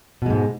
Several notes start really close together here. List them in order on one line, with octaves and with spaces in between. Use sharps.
B2 G#3 G#2